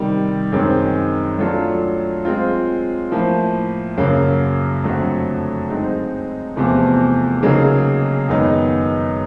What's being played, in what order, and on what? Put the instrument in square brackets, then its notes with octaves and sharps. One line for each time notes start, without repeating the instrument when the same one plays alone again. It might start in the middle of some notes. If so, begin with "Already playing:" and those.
Already playing: [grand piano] C3 D#3 G3
F#2 D#3 G#3 C4
F#3 A3 D4 F4 A4
G#3 C4 F4
A2 F3 A#3
F#2 C#3 F#3 A#3
F2 D3 F#3 A3
G#3 C4 D#4
E2 C3 F3 A3
C#3 F#3 A#3 D#4 G#4
F#2 D#3 G#3 B3 D#4